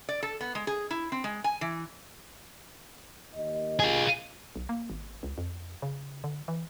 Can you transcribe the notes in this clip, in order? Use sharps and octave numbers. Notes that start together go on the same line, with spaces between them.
D5
A4
B3
G#3
G#4
E4
C4
G#3
G#5
E3
D#2 D#5
F4 G#4
B1
A#3
G#1
C#2
F2
C#3
D3
E3